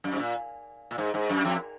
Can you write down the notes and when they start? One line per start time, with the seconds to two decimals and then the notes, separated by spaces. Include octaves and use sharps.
0.04 F#2
0.12 G#2
0.19 A#2
0.91 A#2
0.98 G#2
1.14 G#2
1.29 F#2
1.45 F2